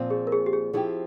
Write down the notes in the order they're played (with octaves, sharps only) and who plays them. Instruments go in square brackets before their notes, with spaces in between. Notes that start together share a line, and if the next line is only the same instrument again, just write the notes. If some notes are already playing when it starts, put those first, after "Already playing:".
Already playing: [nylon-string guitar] A#2 F3 C4 F4
[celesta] G#4
A#4
G#4
G4
G#4
[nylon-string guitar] F3 C4 E4 G4 [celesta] G#4